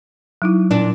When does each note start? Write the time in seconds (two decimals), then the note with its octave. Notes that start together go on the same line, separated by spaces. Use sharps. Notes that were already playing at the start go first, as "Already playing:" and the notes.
0.42 F#3 D#4 E4
0.71 A#2 D4